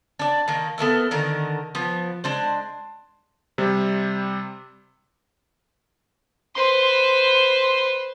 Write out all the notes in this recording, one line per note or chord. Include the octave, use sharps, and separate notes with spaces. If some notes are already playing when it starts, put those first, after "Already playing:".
D4 D5
D#3 A#3
B3 A4 A#4 E5
D3 D#3 A#4
F3 B3
G#3 D4 C5
C3 G3
B4 C5 C6